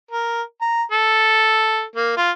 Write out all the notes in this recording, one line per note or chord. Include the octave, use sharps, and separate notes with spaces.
A#4
A#5
A4
A#3
F4